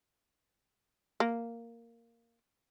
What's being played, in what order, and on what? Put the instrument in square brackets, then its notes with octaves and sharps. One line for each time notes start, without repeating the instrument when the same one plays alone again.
[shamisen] A#3